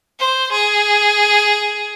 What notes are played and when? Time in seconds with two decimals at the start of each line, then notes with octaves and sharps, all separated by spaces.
0.19 C5
0.52 G#4